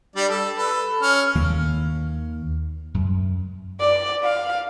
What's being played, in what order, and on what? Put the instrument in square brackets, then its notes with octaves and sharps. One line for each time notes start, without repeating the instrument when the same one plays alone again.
[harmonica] G3 D4 D5
A4
A4 B4
C#4 F6
[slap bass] D#2 D#3 A#3
F#2
[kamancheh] D5
F5